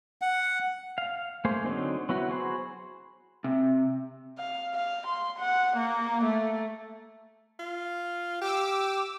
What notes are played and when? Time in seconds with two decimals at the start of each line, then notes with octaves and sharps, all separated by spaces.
0.21 F#5
0.98 F5
1.45 A3 A#3 G#4 C5
1.64 D3 F#3 C4 D#4
2.09 F#3 B3 E4 F#4
2.30 F#4 G#4 C5 B5
3.44 C3
4.38 F5
4.74 F5
5.07 C6
5.39 F#5
5.77 A#3
6.24 A3
7.59 F4
8.41 G4 D6 E6